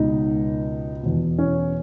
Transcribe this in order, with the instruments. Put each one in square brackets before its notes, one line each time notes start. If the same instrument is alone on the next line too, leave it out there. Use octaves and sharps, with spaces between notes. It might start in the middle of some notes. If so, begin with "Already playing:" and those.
Already playing: [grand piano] C#2 B2 D#4
E2 B2
C#4